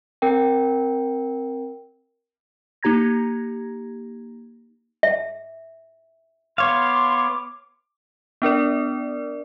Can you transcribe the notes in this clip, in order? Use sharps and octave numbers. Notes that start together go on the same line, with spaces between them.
C4 A#4 G5
A#3 D#4 G4 A#5 G#6 A#6
E5
B3 C#5 F5 C6 D6
B3 D4 A#4 D5